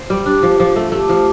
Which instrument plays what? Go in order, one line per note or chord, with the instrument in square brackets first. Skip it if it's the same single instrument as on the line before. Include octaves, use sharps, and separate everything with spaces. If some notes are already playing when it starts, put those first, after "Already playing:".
Already playing: [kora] C5
G3
[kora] D4 [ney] G4
[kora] F3
F3
A3
[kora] A3 [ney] G4
[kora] F3